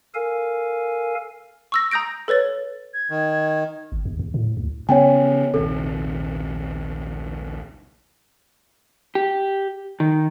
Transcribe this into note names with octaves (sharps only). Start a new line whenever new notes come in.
A4 A#4 F5 G#5
C#6 E6 A#6
A#5 D#6 G6 A#6 D7
A4 B4 C#5 A6
G#6
D#3
G1
D#2
D#2
A2
D2
C#3 B3 C#4 C#5 G5 G#5
A#1 D#2 C3 A4
G4
D#3